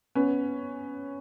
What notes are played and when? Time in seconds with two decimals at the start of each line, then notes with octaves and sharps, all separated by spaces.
0.15 B3 C#4